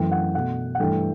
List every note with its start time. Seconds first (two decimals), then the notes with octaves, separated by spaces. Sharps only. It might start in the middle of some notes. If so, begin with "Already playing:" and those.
Already playing: F#2 E3 A3 G5
0.12 F#5
0.34 B2 A3 F#5
0.75 F#5
0.80 G2 E3 A3 G5